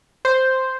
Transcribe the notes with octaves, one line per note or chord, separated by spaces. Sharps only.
C5